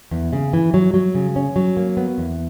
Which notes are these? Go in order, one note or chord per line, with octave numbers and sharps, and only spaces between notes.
E2
C#3
E3
F#3
F#3
C#3
C#4
F#3
A#3
B3
E2